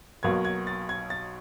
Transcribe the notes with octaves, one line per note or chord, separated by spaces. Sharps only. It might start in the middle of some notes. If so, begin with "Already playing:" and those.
B1 B2 F#3 A#3 G#6
G#6
A6
G#6
A6